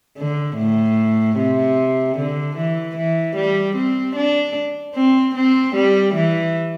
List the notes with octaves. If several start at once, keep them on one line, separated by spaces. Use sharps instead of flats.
D3
A2
C3
D3
E3
E3
G3
C4
D4
C4
C4
G3
E3